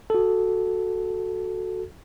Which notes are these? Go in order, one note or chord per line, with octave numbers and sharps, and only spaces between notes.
F#4 A4